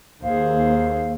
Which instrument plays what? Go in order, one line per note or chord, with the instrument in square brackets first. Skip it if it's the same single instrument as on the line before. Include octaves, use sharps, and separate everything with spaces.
[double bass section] D#2 [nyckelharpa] G#4 C5 [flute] F5